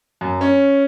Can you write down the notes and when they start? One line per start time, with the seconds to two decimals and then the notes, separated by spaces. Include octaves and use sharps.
0.21 F#2
0.41 C#4